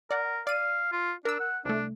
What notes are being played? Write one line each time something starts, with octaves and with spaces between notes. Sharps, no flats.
A#4 D5 F#5
D5 F5 D#7
F4
D4 A#4 E6
F#5
C2 A3 D4